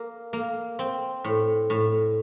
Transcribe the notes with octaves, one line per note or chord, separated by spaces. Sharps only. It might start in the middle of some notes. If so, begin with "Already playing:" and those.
Already playing: A#3
A#3
C4
A2
A2